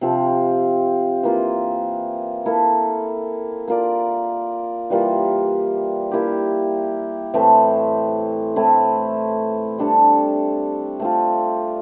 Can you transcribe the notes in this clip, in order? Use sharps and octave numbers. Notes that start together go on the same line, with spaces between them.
C3 F3 C4 F4
E3 A#3 F4
A#3 E4 A4
A#3 F4 A#4 D5
E3 G3 A#3 F4
A#3 E4 G4
A2 E3 A3 C4
A3 C4 E4
G3 D4 A4
A3 C4 F4